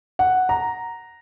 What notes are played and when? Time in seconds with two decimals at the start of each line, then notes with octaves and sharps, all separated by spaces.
0.19 F#5
0.49 A#5